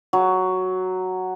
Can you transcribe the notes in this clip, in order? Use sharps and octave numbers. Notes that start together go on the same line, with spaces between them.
F#3